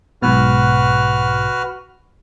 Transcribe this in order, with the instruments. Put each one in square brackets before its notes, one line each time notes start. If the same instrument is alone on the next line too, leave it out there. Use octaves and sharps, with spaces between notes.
[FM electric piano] B1 G#2 B2 [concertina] F#4 B4 F6